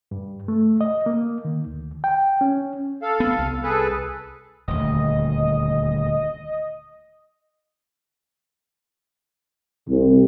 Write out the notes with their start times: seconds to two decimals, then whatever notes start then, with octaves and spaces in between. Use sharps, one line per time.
0.11 G2
0.48 A3
0.81 D#5
1.06 A#3
1.45 D#3
1.67 D2
2.04 G5
2.41 C#4
3.02 A4 F5
3.20 B3
3.39 C2
3.63 G#4 A4 B4
4.68 D#1 D2 D#5
9.88 C2